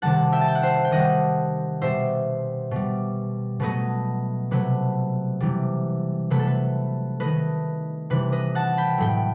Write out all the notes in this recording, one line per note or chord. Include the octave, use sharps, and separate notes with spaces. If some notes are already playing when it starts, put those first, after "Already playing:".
C3 D#3 G3 F#5 A5
E5 G5
A5
G5
F#5
C5 E5
G5
D#3 G3 D#5 F#5
B2 G3 C5 E5
B2 G3
B2 F#3 A3 B4 D#5
C3 F#3 A3 B4
C3 E3 G3
C3 F#3 A3 B4
A4
B4
D#3 A3 B4 D#5
C3 E3 G3 B4
B4 D#5
F#5 A5
G5 B5
A2 F#3 A3 G5 B5